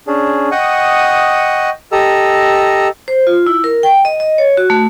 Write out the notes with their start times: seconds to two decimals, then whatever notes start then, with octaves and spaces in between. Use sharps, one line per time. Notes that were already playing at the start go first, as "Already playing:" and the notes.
0.07 C#4 D4 G#4
0.51 D#5 F#5 G5 C#6 D#6
1.92 G4 A4 D#5 A#5 E6
3.08 C5
3.27 F4
3.47 E4
3.64 A#4
3.83 G5
4.05 D#5
4.20 D#5
4.38 C#5
4.57 F#4
4.70 A3